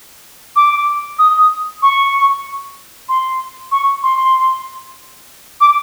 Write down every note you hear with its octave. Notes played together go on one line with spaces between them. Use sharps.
D6
D#6
C#6
C6
C#6
C6
D6